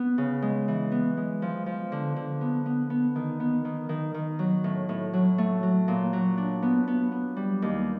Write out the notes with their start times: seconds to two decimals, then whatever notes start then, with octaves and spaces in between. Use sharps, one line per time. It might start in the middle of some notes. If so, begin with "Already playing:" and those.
Already playing: B3
0.18 C#3
0.42 G#3
0.68 E3
0.92 B3
1.17 G#3
1.42 F3
1.66 F3
1.92 D3
2.16 D3
2.41 B3
2.66 B3
2.90 B3
3.15 D#3
3.40 B3
3.65 D#3
3.89 D#3
4.14 D#3
4.39 F#3
4.64 A2
4.89 A2
5.13 F#3
5.38 A3
5.63 F#3
5.88 A#2
6.13 F#3
6.37 D4
6.62 B3
6.88 B3
7.12 B3
7.36 G3
7.62 D#2